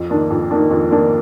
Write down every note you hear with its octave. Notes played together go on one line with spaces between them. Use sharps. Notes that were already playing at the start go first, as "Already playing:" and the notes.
Already playing: F2
D#3 A#3 D4
F2
D#3 A#3 D4
F2
D#3 A#3 D4